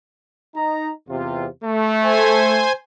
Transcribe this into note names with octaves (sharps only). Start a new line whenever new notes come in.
D#4 A#5
E2 C3 F4
A3
C5 G#5